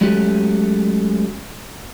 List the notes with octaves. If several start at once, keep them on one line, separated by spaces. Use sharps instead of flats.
F#3 G#3 A3 C#4 F#4 G4